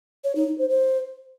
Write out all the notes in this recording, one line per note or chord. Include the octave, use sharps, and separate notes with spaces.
C#5
D#4
D#4
C5
C5